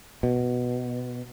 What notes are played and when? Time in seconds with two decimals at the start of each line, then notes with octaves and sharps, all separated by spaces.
0.23 B2